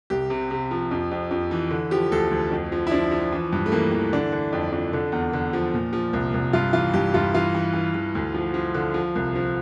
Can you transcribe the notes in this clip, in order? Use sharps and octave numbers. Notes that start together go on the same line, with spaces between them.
C2 G4
C3
C3
F3
F2
F2
F2
E3
D3
F3 G4
D2 A4
D2
F2
F3
E4
F3 D4
F3
E3
G2
A3
E3 A#3
E3
D3 D4
D3
F2
F2
D3
E2
D3
F3
A#2
F3
C2
C2
G2 F4
E3 F4
G2 G4
G2 F4
E3 F4
E3
E3
E3
D2
F3
F3
D3
F3
C2
F3